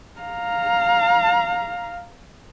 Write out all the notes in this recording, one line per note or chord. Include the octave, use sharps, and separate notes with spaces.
F5 A#5